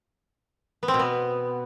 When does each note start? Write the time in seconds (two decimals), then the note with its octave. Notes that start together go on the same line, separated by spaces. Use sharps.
0.83 B3
0.88 C4
0.94 B2
0.99 B3